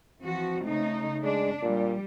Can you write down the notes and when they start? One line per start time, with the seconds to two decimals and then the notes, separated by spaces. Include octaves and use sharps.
0.21 E3 F3 C4 F#4
0.63 C#3 A3 D#4
1.23 G#3 D4
1.62 A#2 G3